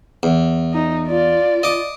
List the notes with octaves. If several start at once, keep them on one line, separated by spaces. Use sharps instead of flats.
E2
D#4
F4 D5
D#5 D6